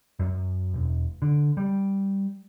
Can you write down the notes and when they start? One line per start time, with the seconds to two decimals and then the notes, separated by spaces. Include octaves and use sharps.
0.19 F#2
0.74 E1
1.22 D3
1.57 G3